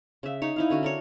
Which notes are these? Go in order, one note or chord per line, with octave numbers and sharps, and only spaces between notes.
C#3 E5
D#4 C#5
D#4 E4 F5
D3 C#4 F#4
D4 A#4 C#5